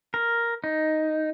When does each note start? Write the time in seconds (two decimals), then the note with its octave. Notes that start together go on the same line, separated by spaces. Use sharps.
0.14 A#4
0.64 D#4